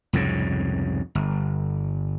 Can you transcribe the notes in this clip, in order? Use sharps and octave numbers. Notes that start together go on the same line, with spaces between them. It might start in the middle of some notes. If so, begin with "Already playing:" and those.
C2 F2 G#2 C#3
G1